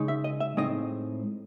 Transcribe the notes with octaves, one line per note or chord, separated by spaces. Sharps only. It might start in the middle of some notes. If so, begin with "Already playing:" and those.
Already playing: C#3 G#3 D#4
E5
D#5
E5
A2 G#3 C4 D#4 D#5